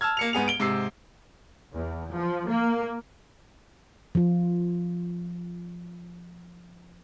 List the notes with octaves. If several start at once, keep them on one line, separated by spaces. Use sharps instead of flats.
A5 E6 F6 G#6
A#3 C#7 F7
G#2 B3 G#4 F7
D7 G7
G#2 C3 E6 C7
E2
F3
A#3
F3 F4